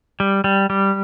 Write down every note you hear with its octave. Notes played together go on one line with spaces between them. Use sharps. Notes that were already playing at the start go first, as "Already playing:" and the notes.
G3
G3
G3